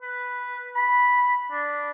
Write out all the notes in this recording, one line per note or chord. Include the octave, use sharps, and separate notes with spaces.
B4
B5
D4